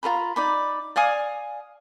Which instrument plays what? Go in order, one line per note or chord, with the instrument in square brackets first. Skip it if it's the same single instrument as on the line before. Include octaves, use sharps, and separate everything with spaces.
[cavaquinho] F4 B4 A#5 B5
D#4 D5 B5
D5 F5 G#5 D#6